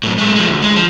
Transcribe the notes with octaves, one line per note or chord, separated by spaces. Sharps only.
A2 F#3
G#3 A3
F3 G#3
D2
G#3
F3